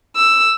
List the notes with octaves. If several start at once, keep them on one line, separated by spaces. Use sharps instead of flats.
E6